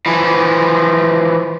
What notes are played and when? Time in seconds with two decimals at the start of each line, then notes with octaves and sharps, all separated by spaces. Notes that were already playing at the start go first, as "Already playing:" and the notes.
0.06 E3 F3